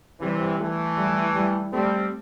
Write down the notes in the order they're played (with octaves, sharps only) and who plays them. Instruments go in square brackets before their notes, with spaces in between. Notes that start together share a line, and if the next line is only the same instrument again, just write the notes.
[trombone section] C3 E3 [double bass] G3
[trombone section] E3 A3
[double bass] G3
G3
[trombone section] G3 C4 [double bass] A3